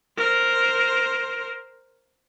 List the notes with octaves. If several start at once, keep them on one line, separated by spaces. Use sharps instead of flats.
A#4 C5